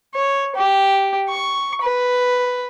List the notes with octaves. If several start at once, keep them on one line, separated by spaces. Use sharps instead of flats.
C#5
G4
C#6
B4